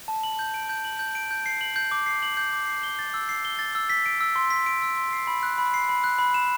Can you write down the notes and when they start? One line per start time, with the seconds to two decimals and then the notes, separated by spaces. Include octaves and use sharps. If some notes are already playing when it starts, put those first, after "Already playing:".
0.08 A5
0.24 F#7
0.39 G6
0.54 D7
0.69 G6
0.85 F#7
0.99 G6
1.15 D7
1.31 G6
1.46 C7
1.61 F#7
1.76 G6
1.91 D6
2.06 C7
2.23 F#7
2.37 G6
2.53 D6
2.67 C7
2.83 G7
2.99 A6
3.14 E6
3.29 C7
3.45 G7
3.59 A6
3.75 E6
3.90 B6
4.06 D7
4.21 E6
4.36 C6
4.50 B6
4.66 D7
4.82 E6
4.97 C6
5.13 C7
5.27 B5
5.43 F#6
5.58 B5
5.74 C7
5.89 B5
6.04 F#6
6.19 B5
6.34 E7